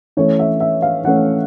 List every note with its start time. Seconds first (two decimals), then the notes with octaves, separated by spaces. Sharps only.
0.17 E3 A3 C#4 C#5
0.39 E5
0.60 E5
0.82 F5
1.04 E3 A3 C#4 F#5